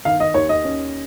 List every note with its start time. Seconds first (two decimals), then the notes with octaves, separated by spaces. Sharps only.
0.05 D#3 F5
0.20 D#5
0.34 D#2 C#5
0.49 D#5
0.64 C#4